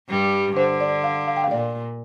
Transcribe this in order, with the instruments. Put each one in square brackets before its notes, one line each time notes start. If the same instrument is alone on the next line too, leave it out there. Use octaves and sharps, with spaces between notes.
[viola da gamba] G2 G3
[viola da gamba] D3 [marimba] C5
[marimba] D5
F5
F5
G5
F5
[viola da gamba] A#2 [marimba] D5